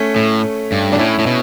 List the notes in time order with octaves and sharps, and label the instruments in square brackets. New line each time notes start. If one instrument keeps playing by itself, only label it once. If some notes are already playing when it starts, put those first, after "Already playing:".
Already playing: [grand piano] A3 C#4
[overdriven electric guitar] A2
G2
[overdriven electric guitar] B2 [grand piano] D4
[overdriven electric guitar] A2 [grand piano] C#4 E4
[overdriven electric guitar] A2
B2